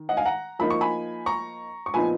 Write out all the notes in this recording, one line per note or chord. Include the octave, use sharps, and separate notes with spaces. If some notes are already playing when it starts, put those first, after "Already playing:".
Already playing: D#3
D#5 F#5
F5 G#5
F#5 A#5
F3 A#3 D#4 B5
C#6
G#5 B5
A#5 C#6
C#6
A#2 F3 B3 D#4 G#5 B5